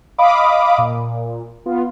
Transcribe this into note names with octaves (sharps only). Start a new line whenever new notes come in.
D#5 F5 B5 D6 D#6
A#2
B3 F4